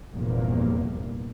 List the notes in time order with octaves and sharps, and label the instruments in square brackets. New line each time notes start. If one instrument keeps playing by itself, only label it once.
[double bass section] F1 E2 G2 A#2 A#3